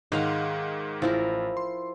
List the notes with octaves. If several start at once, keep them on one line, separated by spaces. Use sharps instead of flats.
G#2 D#3 G#3 F5 F#5
A1 F3 E4 A#4
C6